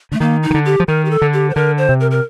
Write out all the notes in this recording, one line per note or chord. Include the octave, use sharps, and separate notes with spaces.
D3 A3
D#3 A#3
D#4
D#3
D3
G4
F3
D#3 A#4
G4
A4
D3
G4
C5
D3 A#4
C5
C3
A#4
A#4